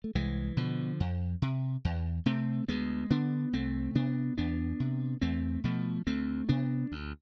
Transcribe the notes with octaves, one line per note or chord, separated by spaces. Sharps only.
A3
C2 E3 G#3
B2 D3 F3
F2
C3
E2
C3 A3 C4
D2 G#3 B3
D3 B3 D4
C2 A3 C4
C3 B3 D4
E2 B3 D4
C3
E2 A3 C4
B2 F3 A3
D2 A3 C4
C3 B3 D4
D2